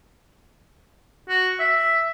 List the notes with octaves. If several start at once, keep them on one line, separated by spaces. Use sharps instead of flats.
F#4
E5